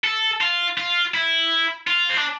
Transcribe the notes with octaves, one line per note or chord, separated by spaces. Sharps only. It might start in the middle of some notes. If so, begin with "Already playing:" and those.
A4
F4
F4
E4
F4
C4
D4